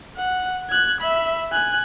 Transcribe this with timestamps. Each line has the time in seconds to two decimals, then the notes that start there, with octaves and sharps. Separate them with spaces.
0.17 F#5
0.70 F#6 G#6
1.01 E5 B5
1.52 G#5 F#6